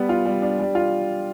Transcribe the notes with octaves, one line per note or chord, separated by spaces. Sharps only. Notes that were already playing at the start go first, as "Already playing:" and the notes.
Already playing: G3 B3
F4
G3
D4
G3
F4